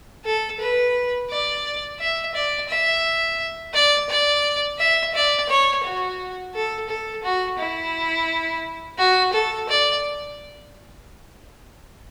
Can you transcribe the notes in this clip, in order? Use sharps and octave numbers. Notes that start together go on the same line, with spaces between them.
A4
B4
D5
E5
D5
E5
D5
D5
E5
D5
C#5
F#4
A4
A4
F#4
E4
F#4
A4
D5